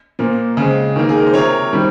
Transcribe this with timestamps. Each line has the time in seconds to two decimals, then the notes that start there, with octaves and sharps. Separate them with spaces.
0.19 A#2 F3 A#3
0.57 C#3 G#3 C4
0.96 D#3 A#3
1.09 G#4
1.18 A#4
1.26 C5
1.34 C3 F3 C4 A#4 C#5
1.73 D#3 G3 C4